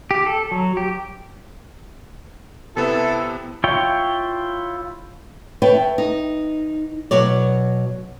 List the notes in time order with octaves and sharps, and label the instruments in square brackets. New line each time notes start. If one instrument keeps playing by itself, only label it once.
[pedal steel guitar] G4
A4
F#3
G4
[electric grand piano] C3 B3 [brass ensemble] E4 [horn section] A4
[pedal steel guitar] E4 F4 C#5 G5
[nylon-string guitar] B4 C#5 E5 G5 A5
D#4
B2 F#3 C#5 D5